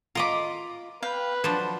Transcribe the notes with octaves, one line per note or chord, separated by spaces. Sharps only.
F4 A#4 D#5 B5 D6
B4 F5 G5
F3 F#3 D4 C5